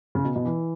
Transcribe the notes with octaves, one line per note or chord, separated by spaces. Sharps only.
C#3
B2
B2
E3